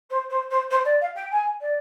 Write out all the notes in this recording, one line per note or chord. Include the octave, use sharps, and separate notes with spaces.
C5
C5
C5
C5
D5
F5
G5
G#5
D5